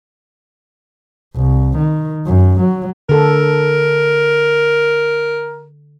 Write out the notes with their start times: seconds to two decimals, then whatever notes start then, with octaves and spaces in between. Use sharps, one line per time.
1.36 C2
1.78 D#3
2.27 F#2
2.61 F#3
3.09 D3 A4 A#4